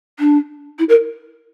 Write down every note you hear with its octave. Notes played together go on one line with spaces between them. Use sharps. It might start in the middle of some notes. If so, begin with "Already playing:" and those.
D4
E4
A#4